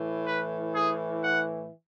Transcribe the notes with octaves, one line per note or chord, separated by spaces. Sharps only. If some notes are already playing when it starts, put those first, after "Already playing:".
Already playing: A2 E3
B4
G#4
F#5